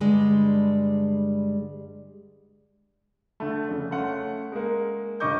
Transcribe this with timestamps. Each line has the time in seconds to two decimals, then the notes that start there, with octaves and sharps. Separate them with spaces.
0.01 G2 D3 G3 G#3
3.40 D3 A3
3.69 F2 C#3
3.91 A3 C#4 F5 F#5 C6
4.52 G#3 A#3
5.20 D#1 G2 D#5 C#6 D6 G6